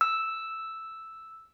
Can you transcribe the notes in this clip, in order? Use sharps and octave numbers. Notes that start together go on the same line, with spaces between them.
E6